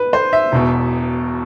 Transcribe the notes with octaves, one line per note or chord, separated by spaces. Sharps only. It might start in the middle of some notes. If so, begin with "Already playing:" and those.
Already playing: B4
C5
E5
E1 E2 B2